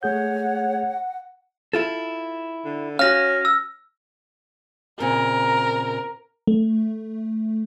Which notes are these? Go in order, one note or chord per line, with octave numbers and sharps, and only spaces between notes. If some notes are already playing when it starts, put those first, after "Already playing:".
A3 G#4 C#5 F#5 G6
E4 F4 A4
D3
C#4 F#4 F5 F6 A#6
E6
A#2 C#3 C4 A#4
A3